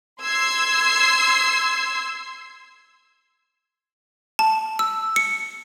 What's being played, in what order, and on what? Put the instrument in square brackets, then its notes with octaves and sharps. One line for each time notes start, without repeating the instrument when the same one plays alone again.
[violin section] C6 E6 G#6 C7
[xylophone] A5
E6
C#7